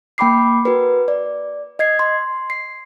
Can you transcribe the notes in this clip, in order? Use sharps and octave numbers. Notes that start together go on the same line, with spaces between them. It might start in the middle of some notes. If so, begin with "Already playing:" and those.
A#3 G5 B5 D6 C7
F#4 A#4 B4
D5
D#5 G#6 C7
C6
C7